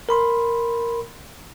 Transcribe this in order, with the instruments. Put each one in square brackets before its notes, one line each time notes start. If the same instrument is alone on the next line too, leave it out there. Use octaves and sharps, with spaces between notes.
[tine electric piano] A#4 B5 C6